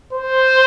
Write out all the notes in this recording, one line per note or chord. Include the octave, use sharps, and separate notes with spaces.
C5